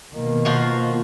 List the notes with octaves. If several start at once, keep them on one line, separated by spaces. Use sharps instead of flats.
B2 D#3 A#3
F3 F4 F#4